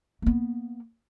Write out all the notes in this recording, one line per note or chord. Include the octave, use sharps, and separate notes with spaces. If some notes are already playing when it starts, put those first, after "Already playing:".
A#3 B3